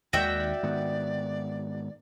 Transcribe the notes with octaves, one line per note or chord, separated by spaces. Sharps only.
D#2 D#3 G#3 F#4 D5 E5 G5
G#2 D#3 B3